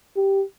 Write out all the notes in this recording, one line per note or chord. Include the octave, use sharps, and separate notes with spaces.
G4